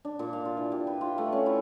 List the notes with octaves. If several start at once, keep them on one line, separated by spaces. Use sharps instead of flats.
D4
A#2
F5
F4
E3
G4
B4
F4
A3
C#4
E4